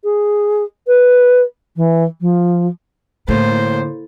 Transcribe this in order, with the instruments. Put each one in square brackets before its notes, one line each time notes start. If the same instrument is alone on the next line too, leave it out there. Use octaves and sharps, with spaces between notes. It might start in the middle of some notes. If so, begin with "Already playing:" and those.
[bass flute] G#4
B4
E3
F3
[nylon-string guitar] A2 [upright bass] D3 [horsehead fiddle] A#3 C5